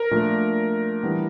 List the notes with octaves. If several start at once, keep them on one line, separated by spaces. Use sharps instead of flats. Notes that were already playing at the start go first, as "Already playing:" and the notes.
Already playing: A#4
A#2 F3 A3 D4
E3 G3 B3 D4